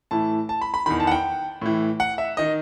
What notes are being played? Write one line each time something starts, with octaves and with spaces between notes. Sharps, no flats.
A2 E3 A5
A5
B5
B5
E2 D#3 B5
A5
F#5
G5
A2 E3
F#5
E5
D#3 D#5